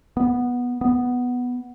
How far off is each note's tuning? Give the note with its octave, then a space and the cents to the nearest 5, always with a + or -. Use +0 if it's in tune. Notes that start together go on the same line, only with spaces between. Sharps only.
B3 -10
B3 +0